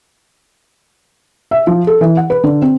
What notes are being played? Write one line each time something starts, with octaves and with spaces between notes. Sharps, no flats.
E5
F3
A4
E3
F#5
B4
D3
C4